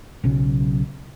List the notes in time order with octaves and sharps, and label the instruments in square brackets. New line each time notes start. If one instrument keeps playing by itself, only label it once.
[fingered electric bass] B1 C#3 F#3